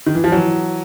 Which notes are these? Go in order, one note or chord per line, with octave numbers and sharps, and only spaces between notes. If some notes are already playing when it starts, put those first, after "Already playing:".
D#3
E3
F3
E3 F#3